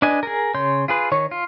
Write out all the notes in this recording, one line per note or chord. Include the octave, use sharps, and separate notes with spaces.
D4 B4 D#5 G#5
G#4 A#4
C#3 C#5 C6 G6
F4 G#4 B4
D#3 C#5 C#6
F4